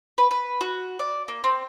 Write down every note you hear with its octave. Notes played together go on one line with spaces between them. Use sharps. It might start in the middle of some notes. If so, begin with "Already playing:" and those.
B4
B4
F#4
D5
A#3
C4